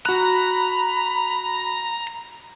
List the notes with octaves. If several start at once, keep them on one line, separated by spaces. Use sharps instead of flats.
F#4 A#5 B5 F#6